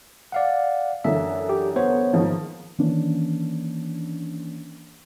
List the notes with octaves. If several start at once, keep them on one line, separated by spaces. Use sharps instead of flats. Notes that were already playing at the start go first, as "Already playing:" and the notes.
D5 F5 F#5
F#2 D3 E3 E5
G4
B3 C5 C#5
G#2 D#3 F3
D#3 E3 A#3 C#4 D4